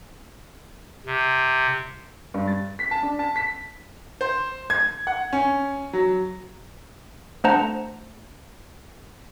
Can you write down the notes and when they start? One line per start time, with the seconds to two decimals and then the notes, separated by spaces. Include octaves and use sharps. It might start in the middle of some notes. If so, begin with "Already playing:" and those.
1.06 C3
2.34 G2
2.48 A6
2.79 B6
2.91 A5
3.03 D4
3.19 A5
3.36 B6
4.21 C5
4.70 G#6
5.07 F#5
5.33 C#4
5.93 F#3
7.44 A3 D4 C5 F#5 A5 A#5